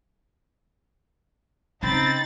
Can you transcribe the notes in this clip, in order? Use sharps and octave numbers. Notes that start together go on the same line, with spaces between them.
C#3 C4 D#4 B5 A6